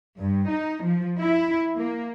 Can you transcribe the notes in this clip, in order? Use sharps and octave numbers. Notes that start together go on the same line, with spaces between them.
G2
D#4
F3
E4
A#3